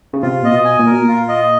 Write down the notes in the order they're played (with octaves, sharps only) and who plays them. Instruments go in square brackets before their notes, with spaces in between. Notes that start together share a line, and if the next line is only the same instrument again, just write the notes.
[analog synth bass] C#3
[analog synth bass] C3 [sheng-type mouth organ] F4
[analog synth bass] A#2 [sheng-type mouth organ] D#5
[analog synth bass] B2
[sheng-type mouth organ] G#5
[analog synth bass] A#2
[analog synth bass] B2 [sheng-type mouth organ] A#4
[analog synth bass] A#2
[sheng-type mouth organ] F4
D#5